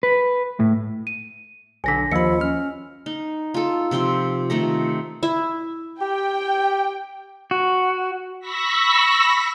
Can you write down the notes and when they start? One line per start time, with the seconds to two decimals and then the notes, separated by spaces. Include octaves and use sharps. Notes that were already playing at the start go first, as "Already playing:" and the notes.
0.03 B4
0.60 A2
1.07 D#7
1.84 B1 D3 G#5 A#6 B6
2.12 D#2 F3 D#5 B5 E6 C#7
2.41 C#4 F6
3.06 D#4
3.54 F4 A4
3.91 C3 F3 G5 C6
4.50 C3 D#3 A3 A#5
5.23 E4 E5
6.01 G4 G5
7.51 F#4
8.40 B5 C#6 E6 A#6 B6